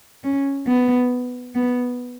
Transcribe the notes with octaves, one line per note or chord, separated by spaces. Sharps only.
C#4
B3
B3